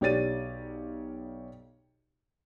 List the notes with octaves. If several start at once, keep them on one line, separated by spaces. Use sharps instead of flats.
B1 G4 C#5 D5 A6 D#7